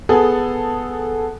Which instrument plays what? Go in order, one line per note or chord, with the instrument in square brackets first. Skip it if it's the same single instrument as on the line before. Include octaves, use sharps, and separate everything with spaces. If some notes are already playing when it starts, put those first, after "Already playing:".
[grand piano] B3 G#4 A4